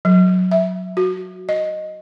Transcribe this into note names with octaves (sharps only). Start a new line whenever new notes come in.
F#3
E5
F#4
D#5